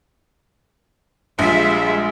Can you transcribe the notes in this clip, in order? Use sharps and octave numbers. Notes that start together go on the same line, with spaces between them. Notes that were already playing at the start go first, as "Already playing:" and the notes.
A#1 G3 G#3 F4 C5 E5